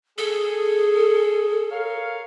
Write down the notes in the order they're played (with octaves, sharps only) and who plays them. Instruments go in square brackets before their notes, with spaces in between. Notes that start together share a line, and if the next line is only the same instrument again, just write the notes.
[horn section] G#4 [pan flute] A4
[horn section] A#4 C#5 F5